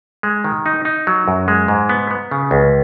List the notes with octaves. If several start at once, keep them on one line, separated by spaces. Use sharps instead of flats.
G#3
D#3
D#4
D#4
F#3
F#2
G#3
G#2
B3
B3
C#3
C#2